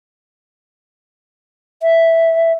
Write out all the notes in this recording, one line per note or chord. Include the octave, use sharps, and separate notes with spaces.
E5